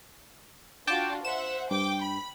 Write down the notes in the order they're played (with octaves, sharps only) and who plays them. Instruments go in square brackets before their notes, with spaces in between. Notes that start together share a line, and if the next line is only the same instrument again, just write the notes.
[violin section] D4 F4 F#4 [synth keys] G5 A5 D6
[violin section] C5 E5 F#5 [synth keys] E7
[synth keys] G2 [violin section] G5 D6
[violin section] B5